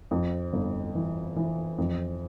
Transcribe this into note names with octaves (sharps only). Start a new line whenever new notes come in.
F2
G1
E3
E3
F2